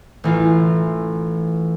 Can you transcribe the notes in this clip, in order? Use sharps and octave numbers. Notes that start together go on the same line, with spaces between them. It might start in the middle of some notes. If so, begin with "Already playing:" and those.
A1 E3 F4